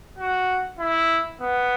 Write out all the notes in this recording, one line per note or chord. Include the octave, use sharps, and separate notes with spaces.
F#4
E4
B3